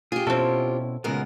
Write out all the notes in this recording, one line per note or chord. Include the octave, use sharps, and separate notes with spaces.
F4 G4 G#4
B2 C4 C#4 E4 A4
F#2 A#2 C#3 G#3 B3 A#4